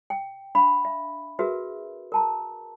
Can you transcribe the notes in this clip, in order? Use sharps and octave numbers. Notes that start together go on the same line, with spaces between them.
G5
D4 F5 B5
E5
F#4 G#4 A#4 B4 E5
A#4 A5 A#5